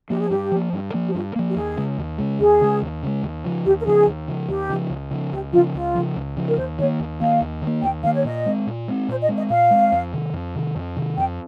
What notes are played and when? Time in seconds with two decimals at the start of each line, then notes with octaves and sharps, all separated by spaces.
0.10 F3 A#3 G4
0.20 G#4
0.30 G2 G4
0.52 F3 A#3
0.73 G2
0.94 F3 A#3
1.08 G4
1.14 G2 F4
1.36 F3 A#3
1.50 G4
1.56 D#2 G#4
1.77 C#3 G#3
1.98 D#2
2.18 C#3 G#3
2.40 D#2 G#4
2.61 C#3 G#3
2.82 D#2
3.03 C#3 G#3
3.23 D#2
3.44 C#3 F3
3.66 D#2 G4
3.80 A#4
3.85 C#3 F3 G#4
4.07 D#2
4.28 C#3 F3
4.48 D#2 G4
4.70 C#3 F3
4.90 C#2
5.11 C#3 F3
5.32 C#2 G4
5.53 F3 F4
5.57 C#3
5.74 C#2 F4
5.95 C#3 F3
6.16 C#2
6.37 C#3 F3
6.47 A#4
6.58 D#2 C5
6.78 D#3 A#3 C#5
7.00 D#2
7.20 D#3 A#3 F5
7.41 D#2
7.62 D#3
7.67 A#3
7.82 D#2 G5
8.03 D#3 F5
8.07 A#3
8.15 C#5
8.25 A#2 D#5
8.46 G#3 C4
8.67 A#2
8.88 G#3 C4
9.08 A#2 C5
9.22 D#5
9.29 G#3 C4
9.37 D#5
9.50 A#2 F5
9.71 G#3 C4
9.92 F2
10.13 C3 D#3
10.33 F2
10.55 C3 D#3
10.75 F2
10.96 C3 D#3
11.17 F2 G5